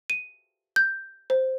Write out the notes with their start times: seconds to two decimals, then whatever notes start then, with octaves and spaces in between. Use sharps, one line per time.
0.10 D#7
0.76 G6
1.30 C5